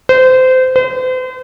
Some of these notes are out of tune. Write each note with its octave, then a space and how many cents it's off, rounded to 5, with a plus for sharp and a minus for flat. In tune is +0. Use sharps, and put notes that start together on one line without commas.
C5 -25
C5 -40